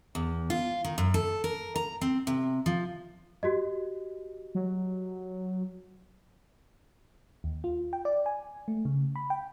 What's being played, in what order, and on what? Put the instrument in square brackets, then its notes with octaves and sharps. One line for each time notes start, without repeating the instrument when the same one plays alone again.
[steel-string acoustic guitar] E2
F4
D#3
F#2
A4
A#4
A#5
C4
C3
F3
[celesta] F#4 G4 D#5
[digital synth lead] F#3
[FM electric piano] D#2
F4
G5
D5
G#5
A3
C#3
B5
G5